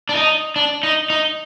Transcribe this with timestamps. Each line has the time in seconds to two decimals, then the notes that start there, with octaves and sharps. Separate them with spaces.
0.09 D4
0.15 D#4
0.56 D4
0.83 D#4
1.10 D#4